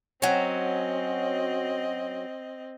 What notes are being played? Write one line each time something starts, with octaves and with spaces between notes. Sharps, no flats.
F#3 C4 C#4 D#5